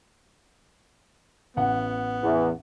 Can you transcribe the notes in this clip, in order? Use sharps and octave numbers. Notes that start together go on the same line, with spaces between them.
A1 B3 F#5
E2